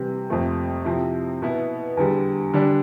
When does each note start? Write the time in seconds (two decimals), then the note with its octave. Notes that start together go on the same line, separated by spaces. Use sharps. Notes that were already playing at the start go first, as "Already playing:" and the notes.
Already playing: C3 E3 G3
0.30 F2 C3 F3 A3 C4
0.85 C3 F3 C4 E4
1.42 B2 B3 E4
1.97 E2 D3 G3
2.53 D3 G3 D4